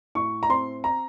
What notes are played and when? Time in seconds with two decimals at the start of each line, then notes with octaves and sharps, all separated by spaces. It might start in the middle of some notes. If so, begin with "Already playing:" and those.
0.15 A2 C#6
0.43 A#5
0.49 C4 C6
0.84 A#5